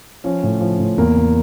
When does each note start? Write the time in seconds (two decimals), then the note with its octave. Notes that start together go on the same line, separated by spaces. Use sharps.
0.24 F3 C#4
0.43 A2
0.61 F3
0.79 A2
0.98 E2 A#3
1.16 E2